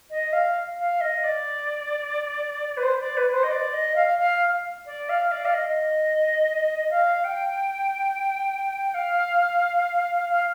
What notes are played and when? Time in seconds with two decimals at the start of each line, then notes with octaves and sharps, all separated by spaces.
0.10 D#5
0.32 F5
0.78 F5
1.00 D#5
1.23 D5
2.77 B4
2.82 C5
2.99 D5
3.16 B4
3.33 C5
3.43 D#5
3.50 D5
3.72 D#5
3.95 F5
4.18 F5
4.85 D5
5.09 F5
5.31 D5
5.45 F5
5.53 D#5
6.90 F5
7.24 G5
8.94 F5
10.29 F5